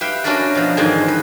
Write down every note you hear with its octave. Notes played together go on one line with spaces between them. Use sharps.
G4 B4 E5 F5 G5
C#4 D4 F#4 A#4 B4 D5
B2 F3
E2 G#2 D3 D#3 C4 G#5
B4